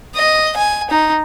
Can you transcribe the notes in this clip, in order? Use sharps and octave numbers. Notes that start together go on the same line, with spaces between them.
D#5
G#5
D#4